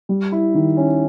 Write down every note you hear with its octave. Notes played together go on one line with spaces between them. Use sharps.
G3
E4
D#3
C#4